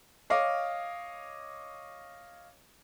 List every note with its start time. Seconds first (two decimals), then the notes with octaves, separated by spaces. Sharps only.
0.30 C#5 D#5 F5 D6